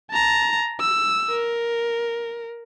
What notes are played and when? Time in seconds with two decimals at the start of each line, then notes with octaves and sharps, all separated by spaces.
0.11 A5 A#5
0.80 E6
1.31 A#4